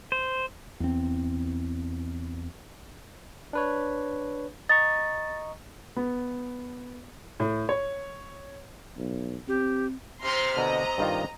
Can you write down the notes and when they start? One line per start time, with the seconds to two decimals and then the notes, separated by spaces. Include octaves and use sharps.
0.12 C5
0.80 E2 C4
3.53 D4 B4 C#5
4.69 D#5 A#5 C#6 A6
5.96 B3
7.40 A2
7.69 C#5
8.97 B1
9.48 C4 G4
10.23 C3 C4 A#5 C6 F6
10.57 B2 D3 D#5 A#5
10.98 G2 D#3 F4